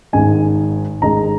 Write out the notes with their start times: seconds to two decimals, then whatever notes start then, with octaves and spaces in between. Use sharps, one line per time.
0.13 G#1 G#2 D#3 G#3 G#5
1.02 G#1 G#2 D#3 G#3 A#5